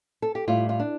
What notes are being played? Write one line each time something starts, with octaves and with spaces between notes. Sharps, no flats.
A4
G4
A2 G3 F4
F4
D4